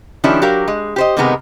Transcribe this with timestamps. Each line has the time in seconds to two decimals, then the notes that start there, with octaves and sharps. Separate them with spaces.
0.24 D#3 F3 G3 C#4 D4 E4
0.42 F#3 G4 A#4 F5
0.68 G#3
0.96 G4 C5 D#5
1.17 C3 D#3 G#3 B3 D4 A#4